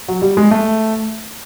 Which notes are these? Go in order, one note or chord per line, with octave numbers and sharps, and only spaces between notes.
F#3
G3
G#3
A3